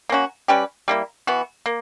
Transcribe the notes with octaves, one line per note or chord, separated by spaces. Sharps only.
A#3 C#4 F#4
G3 C#4 G4 B4
G3 A#3 E4
E3 B3 F#4
A#3